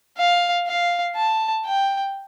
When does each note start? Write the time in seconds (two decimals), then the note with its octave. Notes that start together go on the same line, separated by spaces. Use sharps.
0.18 F5
0.67 F5
1.16 A5
1.65 G5